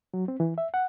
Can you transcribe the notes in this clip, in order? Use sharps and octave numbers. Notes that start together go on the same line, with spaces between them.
F#3
C4
E3
E5
F#5